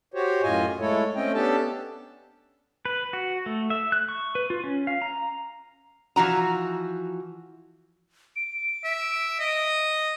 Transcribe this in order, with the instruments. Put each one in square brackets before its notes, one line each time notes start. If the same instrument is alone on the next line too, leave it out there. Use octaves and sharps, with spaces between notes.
[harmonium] F#4 G4 C5 C#5
F#2 A2 F4 D#5 G#5
G#3 A3 E4 A4 C#5
A3 C4 C#4 D#5 G5
B3 C#4 D4 G4 A4 A5
[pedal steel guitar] B4
F#4
A3
E5
F#6
C#6
B4
F4
C#4
F5
A#5
[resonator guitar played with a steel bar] E3 F3 F#4 A#5
[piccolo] D7
[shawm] E5
D#5